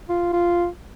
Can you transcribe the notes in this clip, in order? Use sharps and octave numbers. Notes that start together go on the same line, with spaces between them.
F4
F4